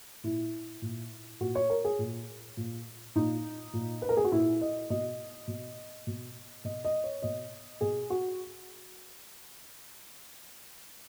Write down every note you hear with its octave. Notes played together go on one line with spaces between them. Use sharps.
A#2 E4
A#2
A#2 F#4
C#5
A#4
G#4
A#2
A#2
A#2 D#4
A#2
B4
A#4
G#4
F#4
A#2 E4
D#5
B2 D#5
B2
B2
B2 D#5
D#5
C#5
B2 D#5
B2 G#4
F#4